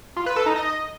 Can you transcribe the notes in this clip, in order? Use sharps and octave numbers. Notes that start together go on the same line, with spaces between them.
F4
B4
A4
D#4
D#5